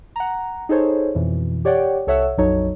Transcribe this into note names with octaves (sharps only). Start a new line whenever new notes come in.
F#5 A#5
D#4 G#4 A4 C5 C#5
F2 B2 E3
G4 C#5 D5 F#5 G5
C2 A4 C#5 E5 F#5 E6
A#1 F2 F#3 D#4 A4 C#5